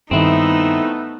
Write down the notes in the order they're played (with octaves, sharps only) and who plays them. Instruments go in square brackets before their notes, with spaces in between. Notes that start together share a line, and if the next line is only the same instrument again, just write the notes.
[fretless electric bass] G2 D#3 [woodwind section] A3 B3 [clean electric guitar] C4 E4 [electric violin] D#4